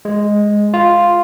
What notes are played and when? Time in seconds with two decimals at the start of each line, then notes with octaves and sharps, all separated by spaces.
0.05 G#3
0.74 F4